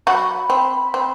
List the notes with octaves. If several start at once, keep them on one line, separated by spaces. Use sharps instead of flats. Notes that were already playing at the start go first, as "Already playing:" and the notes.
F#3 F#4 B5
C4
C4